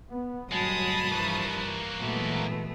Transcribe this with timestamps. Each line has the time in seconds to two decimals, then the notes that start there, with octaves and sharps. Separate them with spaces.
0.11 B3
0.51 G1 A#2 F#3 G#3 A5 B5 D#6
1.12 G2 E3 F3 A#3 F#4
1.98 A#2 E3 F#3 G#3 A3 B3